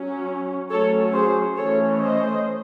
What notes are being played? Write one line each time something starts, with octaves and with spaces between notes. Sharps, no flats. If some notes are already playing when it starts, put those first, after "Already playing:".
Already playing: F#3 C#4
F#3 A3 C#4 A4 C#5
G#4 C5
E3 A3 C#4 A4 C#5
C5 D#5